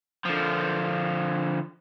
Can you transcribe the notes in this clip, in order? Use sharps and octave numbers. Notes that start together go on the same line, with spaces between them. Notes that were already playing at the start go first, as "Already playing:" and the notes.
D3 F3